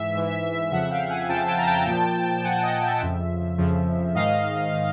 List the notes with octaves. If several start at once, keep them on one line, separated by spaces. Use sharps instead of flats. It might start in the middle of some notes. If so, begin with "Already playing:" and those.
Already playing: G#2 E3 E5
G#2 E3
F2 C#3 F3 E5 F#5
F5 G5
F#5 G#5
F2 C#3 F3 G5 A5
G5 A5
A#5
G5 A5
A#2 F3
A#2 F3 F#5 G#5
D#5
E5
F2 C#3 F3
F2 C#3 F3
G#2 D#3 D#5 F5
D#3